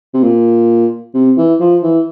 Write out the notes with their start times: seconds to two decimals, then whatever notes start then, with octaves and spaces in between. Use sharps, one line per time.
0.14 C3
0.23 A#2
1.14 C3
1.37 E3
1.60 F3
1.83 E3